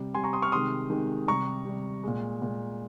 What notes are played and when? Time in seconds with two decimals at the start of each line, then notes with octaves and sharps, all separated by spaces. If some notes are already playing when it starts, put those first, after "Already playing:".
Already playing: C3 G3
0.15 C3 G3 G#5 C6
0.24 A#5 C#6
0.33 C6 D#6
0.42 C#6 F6
0.52 C3 D#3 G#3 C6 D#6
0.90 C3 D#3 G#3
1.27 C3 G3 A#5 C#6
1.65 C3 G3
2.04 A#2 G#3
2.42 A#2 G#3